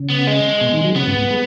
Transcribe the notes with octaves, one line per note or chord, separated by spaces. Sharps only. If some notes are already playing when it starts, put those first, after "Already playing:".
Already playing: C#3
B3
G#3
B2
D#3
F#3
C#3 B3
G#2
G#2
G#3